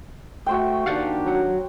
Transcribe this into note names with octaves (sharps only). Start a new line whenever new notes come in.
A3 F#4 C5 G5
D#3 A#3 D4 G4 F5 F#5 A6
F#3 F#5